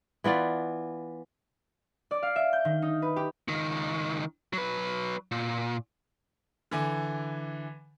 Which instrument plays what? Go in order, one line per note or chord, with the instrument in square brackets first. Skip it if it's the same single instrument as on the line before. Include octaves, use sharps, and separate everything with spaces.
[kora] E3 B3 F4 D5
[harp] D5
F5
E5
G6
D#3
D#4
B4
G4
[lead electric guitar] C#2 D#3
F#3 B4
A#2
[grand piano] D3 E3 G#5 D6